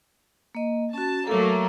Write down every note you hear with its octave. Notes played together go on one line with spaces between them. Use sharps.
A#3 D#5
C#4 F#4 A5
F#3 A3 A#3 A4 A5